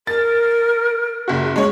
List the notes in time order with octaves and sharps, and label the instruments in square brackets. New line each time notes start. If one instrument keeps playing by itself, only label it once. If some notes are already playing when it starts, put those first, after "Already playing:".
[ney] A#4 [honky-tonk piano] A6
[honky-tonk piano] F#1 F#4
G#3 C#5